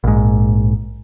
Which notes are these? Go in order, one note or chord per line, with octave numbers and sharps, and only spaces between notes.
A#1 G#2